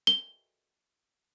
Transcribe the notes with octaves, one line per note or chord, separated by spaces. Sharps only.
G7